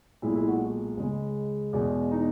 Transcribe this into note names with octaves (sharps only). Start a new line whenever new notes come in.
B1 A#2 G#3 E4
E4
F#4
C#2 C#3 G#3
E2 B2 G#3
D#4